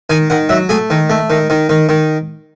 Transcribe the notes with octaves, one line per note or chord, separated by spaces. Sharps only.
D#3 G#5
D#3 F#5
F#3 E5
A3 G#4
D#3
A3
D#3
D#3
D#3
D#3